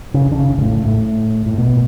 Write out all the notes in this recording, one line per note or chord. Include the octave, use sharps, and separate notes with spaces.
C#3
D3
C#3
G2
A2
A2
A2
B2